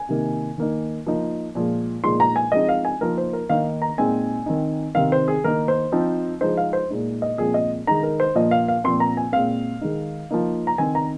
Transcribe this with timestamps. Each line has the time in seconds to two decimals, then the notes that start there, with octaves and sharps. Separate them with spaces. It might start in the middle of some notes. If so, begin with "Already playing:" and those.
Already playing: G#5
0.09 C3 D#3 A#3 D#4
0.58 D#3 A#3 D#4
1.06 F3 A#3 D#4
1.55 A#2 F3 G#3
2.04 A#2 F3 G#3 D#4 C6
2.20 A#5
2.36 G#5
2.52 F3 G#3 C4 D#4 D#5
2.69 F5
2.85 G#5
3.01 F3 A#3 D#4 A#4
3.18 C5
3.33 A#4
3.49 D#3 A#3 D#4 F5
3.82 A#5
3.98 A#2 G#3 C4 D#4 G#5
4.46 D#3 C4 D#4
4.95 C3 D#3 C4 D#4 F5
5.12 C5
5.28 G#4
5.44 D#3 A#3 D#4 A#4
5.68 C5
5.92 F3 C4 D#4
6.41 F3 G#3 D#4 C5
6.57 F5
6.73 C5
6.90 A#2 G#3 D#4
7.22 D#5
7.38 A#2 F3 G#3 C4 G#4
7.54 D#5
7.87 D#3 G#3 D#4 A#5
8.03 A#4
8.20 C5
8.35 A#2 F3 A#3 D#5
8.51 F5
8.68 F5
8.84 A#2 F3 C4 C6
9.00 A#5
9.17 G#5
9.32 A#2 G#3 C4 F5
9.81 D#3 G#3 D#4
10.31 F3 A#3 D#4
10.67 A#5
10.78 D#3 C4 D#4 G#5
10.95 A#5